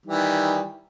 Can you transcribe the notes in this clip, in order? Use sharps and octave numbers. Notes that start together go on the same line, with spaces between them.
D#3 E3 G3